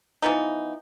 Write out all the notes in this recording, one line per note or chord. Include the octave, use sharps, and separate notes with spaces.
E3 F3 B3 D#4